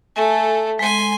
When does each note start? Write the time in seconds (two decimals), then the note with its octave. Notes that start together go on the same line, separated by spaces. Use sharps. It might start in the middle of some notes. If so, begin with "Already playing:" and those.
0.16 A3 A4 G#5
0.79 G#3 G#5 C6